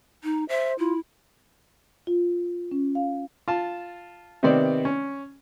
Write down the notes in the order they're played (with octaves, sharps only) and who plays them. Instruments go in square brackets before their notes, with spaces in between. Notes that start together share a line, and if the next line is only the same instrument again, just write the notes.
[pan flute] D#4
[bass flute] C5 [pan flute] E5
[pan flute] E4 [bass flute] F4
[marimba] F4
C#4
F5
[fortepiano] F4 A5
C3 D#3 B3 C4 D5
C#4